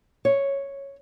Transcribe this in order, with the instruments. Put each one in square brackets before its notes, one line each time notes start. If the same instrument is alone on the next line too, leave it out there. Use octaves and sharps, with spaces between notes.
[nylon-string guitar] C#5